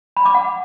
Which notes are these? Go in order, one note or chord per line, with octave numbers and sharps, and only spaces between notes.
B5
D6
F#5